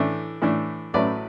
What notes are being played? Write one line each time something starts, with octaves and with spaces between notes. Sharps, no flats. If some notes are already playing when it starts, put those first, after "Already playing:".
Already playing: A2 E3 A3 D4
A2 E3 A3 D4
A1 A2 F#3 A3 B4 D5